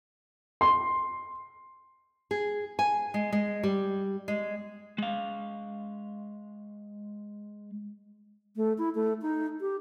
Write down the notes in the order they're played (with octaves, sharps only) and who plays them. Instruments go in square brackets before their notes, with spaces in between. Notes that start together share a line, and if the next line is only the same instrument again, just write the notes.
[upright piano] C6
[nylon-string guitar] G#4
G#5
G#3
G#3
G3
G#3
[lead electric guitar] G#3 F5
[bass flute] A3
E4
A3
D#4
G4